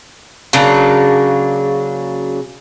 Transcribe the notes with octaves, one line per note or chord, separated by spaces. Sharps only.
C#3 F#3 A#3 D4